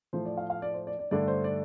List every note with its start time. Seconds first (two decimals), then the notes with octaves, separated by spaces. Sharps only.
0.13 A2 F3 A3 C5
0.25 D5
0.38 F5
0.50 F5
0.62 D5
0.74 C5
0.87 D5
0.99 D5
1.11 G2 D3 A3 D4 D5
1.28 C5
1.44 D5